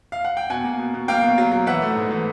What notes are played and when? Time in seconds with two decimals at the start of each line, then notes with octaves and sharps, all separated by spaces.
0.12 F5
0.25 F#5
0.37 G5
0.50 B2 F#5 G#5
0.64 A#3
0.79 B2
0.94 B2
1.08 A#3 F5 G5
1.23 B2
1.38 F#3
1.52 F#3
1.66 E3 E5 F#5
1.82 A3
1.96 G#2
2.10 E3